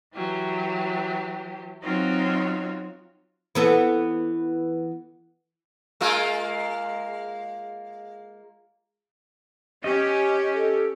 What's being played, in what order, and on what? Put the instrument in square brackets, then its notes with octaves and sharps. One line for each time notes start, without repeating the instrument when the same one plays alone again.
[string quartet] E3 F#3 G4
F#3 C4 D#4 F4 F#4 C#5
[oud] E3 B3 A4
[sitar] G#3 A#3 F4
[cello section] C#4 G4 [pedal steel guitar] D#5
[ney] A4